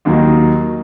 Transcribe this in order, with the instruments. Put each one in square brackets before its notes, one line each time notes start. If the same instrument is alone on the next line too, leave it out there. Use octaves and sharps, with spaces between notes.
[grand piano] D#2 D#3 F#3 A#3